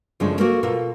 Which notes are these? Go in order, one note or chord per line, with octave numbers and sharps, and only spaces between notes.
F#2 C#3 F3 G#3 A3 D4
A#3 F#4 A4 A#4
B2 F4 A4 A#4